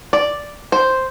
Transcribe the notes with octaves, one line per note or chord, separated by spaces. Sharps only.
D5
C5